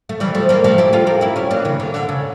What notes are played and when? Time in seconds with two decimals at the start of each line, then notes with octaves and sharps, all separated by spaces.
0.09 A3
0.20 E3 G3
0.35 F3 A3
0.49 G3 A#3
0.64 F3 A3
0.78 E4 G4
0.93 F4 A4
1.07 G4 A#4
1.21 E4 G4
1.36 C#4 E4
1.51 A#3 D4
1.65 C#3 E3
1.80 D3
1.94 D3
2.09 C#3